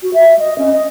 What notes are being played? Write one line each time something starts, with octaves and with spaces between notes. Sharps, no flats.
F#4
E5
D#5
C#4
D#5